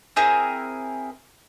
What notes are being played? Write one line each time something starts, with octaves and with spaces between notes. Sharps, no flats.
C4 E4 G#4 A#4